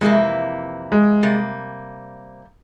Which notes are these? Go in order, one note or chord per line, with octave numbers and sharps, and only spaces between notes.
F2 C3 E3 G#3 A#3 E4
G#3
C3 G3 A#3